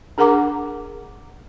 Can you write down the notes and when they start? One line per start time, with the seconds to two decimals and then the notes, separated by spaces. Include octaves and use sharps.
0.18 D4 G#4 A#4 F#5 A#5 D6